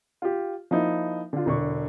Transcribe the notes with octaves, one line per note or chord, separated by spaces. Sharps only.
F4 G4
F3 A#3 D#4 E4
D3 F4
E1 D3 C#6